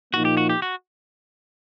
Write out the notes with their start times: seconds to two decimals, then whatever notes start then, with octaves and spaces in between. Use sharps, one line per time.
0.14 A#2 F3 A#3 D#4 F#4
0.25 G4
0.37 F#4
0.49 G4
0.62 F#4